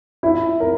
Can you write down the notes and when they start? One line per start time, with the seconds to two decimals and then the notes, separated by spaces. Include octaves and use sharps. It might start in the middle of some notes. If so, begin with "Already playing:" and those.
0.23 E4
0.60 A#4